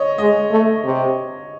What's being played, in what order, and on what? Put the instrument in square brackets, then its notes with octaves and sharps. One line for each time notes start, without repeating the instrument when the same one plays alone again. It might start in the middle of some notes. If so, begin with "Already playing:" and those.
Already playing: [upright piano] C#5 D#5
[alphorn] G#3 [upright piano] D#5
[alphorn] A3
C3